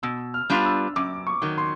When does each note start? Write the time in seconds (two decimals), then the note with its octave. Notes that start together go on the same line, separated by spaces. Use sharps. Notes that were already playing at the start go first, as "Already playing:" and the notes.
0.03 B2 E6
0.34 F6
0.50 G3 B3 D4 F4
0.65 E6
0.96 F#2 D6
1.27 C#6
1.42 D#3 F#3
1.58 C6